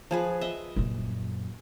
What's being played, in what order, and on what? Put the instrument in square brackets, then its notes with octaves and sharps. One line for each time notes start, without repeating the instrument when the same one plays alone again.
[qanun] F3 G#4 B4
D#5 E5
[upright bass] F#2 A#2